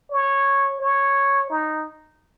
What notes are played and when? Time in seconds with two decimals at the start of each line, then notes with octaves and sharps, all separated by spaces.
0.12 C#5
0.81 C#5
1.50 D#4